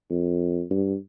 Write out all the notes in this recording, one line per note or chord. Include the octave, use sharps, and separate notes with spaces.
F2
G2